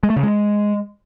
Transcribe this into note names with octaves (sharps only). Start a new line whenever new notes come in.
G#3
A3
C#3
G#3